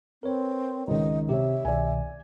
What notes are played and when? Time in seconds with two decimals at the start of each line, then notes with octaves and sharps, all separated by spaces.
0.23 C4 A#4 B4 C#5
0.87 C#2 D#3 D#5
1.29 C3 G4 C#5 E5
1.65 C2 B2 D#3 D5 G#5